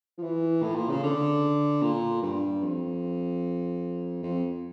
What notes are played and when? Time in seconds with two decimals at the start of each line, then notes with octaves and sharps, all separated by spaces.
0.18 F3
0.23 E3
0.63 A2
0.75 A#2
0.89 C#3
1.03 D3
1.82 A#2
2.22 G2
2.63 F2
4.23 F2